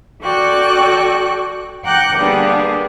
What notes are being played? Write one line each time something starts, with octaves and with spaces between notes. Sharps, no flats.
F#4 A4 D5 G5 C#6 F#6
F#5 G5 A#5 D6 F#6 G6
D3 G3 A#3 B3 D4 G#4